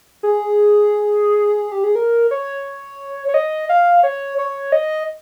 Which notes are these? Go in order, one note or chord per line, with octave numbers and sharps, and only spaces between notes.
G#4
G4
G#4
A#4
C#5
C#5
D#5
F5
C#5
C#5
D#5